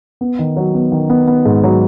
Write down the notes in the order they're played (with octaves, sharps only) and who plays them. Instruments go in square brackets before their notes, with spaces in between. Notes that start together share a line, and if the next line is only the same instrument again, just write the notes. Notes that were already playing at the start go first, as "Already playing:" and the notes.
[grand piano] B3
D#3
F#3
B3
D#3
B3
B3
G#2
F#3